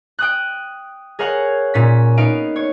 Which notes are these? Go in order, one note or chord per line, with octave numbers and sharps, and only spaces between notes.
G5 D#6 F#6
G#4 A#4 C#5 F5 F#5
A#2 C#4 B6
B3 D#4 F5 D7
C#5